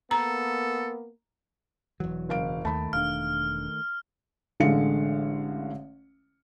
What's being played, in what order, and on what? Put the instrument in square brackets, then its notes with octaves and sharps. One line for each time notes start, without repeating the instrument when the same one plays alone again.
[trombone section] A#3 B3 A#4 [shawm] A4 [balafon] A#5
[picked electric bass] E1 F#3 [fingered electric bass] E3
[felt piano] F#1 F5 D7
[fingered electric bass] D#2 [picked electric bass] D#3 A3 [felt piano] A5 B5
[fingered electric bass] E1 D4 [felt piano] F5 [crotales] F6
[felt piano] A1 D3 G#3 F5 C#7